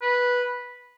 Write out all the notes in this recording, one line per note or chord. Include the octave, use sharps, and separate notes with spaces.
B4